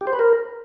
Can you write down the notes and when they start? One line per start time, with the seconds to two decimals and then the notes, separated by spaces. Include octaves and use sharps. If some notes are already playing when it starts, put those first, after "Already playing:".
0.01 G4
0.07 C5
0.13 B4
0.19 A#4